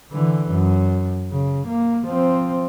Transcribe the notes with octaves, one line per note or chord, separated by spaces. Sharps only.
D3 E3
F#2
C#3
A#3
F3 C4